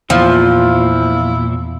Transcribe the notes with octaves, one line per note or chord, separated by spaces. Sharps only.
E2 A#2 F3 E4